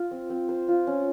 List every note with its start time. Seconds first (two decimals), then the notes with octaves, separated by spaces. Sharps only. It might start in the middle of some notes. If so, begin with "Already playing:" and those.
Already playing: F4
0.11 C4
0.30 C4
0.49 C5
0.68 F4
0.87 C#4